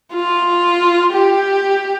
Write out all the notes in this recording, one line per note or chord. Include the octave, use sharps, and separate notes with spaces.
F4
G4